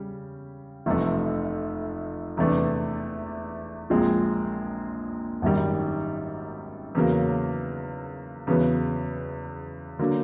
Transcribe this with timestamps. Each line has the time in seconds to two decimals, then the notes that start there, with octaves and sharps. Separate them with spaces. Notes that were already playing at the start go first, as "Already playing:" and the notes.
Already playing: C#3 G3
0.86 F1 F2 C3 E3 A3
2.37 E2 C3 E3 A3 D4
3.90 A#1 A#2 F3 G#3 C4
5.42 G#1 F#2 D#3 G3
6.95 E2 C#3 F#3 A#3
8.47 E2 C#3 F#3 B3
9.99 D3 F#3 A#3